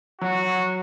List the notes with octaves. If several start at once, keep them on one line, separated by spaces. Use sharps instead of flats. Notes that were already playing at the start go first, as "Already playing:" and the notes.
F#3 F#4